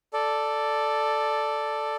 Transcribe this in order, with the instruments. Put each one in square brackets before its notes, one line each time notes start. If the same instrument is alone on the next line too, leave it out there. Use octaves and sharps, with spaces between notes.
[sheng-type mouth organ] A4 D5